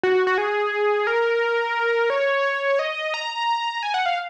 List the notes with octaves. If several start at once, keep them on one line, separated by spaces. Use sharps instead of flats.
F#4
F#4
G#4
A#4
C#5
D#5
A#5
G#5
F#5
F5